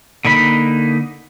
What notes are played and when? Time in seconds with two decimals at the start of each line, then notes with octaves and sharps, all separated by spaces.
0.25 D3 A#3 D#4 B5